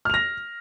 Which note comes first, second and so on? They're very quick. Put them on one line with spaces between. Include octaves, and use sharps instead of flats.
F6 F7 A#6